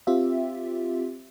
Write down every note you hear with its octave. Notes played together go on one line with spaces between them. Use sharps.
C4 F4 G4 E5